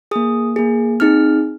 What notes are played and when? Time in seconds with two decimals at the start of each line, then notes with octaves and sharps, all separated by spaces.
0.11 A#3 G#4 D#6
0.56 A#3 G#4
1.00 C4 D#4 G#4 F6